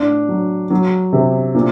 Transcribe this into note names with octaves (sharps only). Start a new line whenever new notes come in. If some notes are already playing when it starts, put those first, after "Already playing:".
Already playing: A2 D4
F#3
F#3
C3
A#2